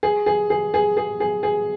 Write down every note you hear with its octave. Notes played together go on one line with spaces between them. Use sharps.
G#4
G#4
G#4
G#4
G#4
G#4
G#4